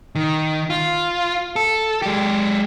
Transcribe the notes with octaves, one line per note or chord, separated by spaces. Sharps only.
D#3
F4
A4
G#3 G4